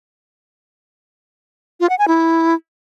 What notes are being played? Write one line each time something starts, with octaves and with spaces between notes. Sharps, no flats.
F4
F#5
G#5
E4